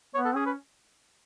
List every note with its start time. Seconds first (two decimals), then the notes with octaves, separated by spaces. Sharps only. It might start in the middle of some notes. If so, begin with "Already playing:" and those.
0.15 B3 C#5
0.25 A4
0.35 C#4 G#4
0.46 B4